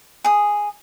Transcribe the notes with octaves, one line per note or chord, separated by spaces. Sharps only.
G#4 D#6